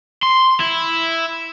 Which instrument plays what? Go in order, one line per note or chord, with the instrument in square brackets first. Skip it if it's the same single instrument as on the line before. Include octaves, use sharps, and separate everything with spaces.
[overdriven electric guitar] C6
E4